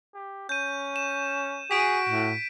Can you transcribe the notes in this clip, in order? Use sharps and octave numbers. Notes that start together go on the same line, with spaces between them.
G4
C#4 G6 D#7
E7
F#4 G#4 B6 D7
A2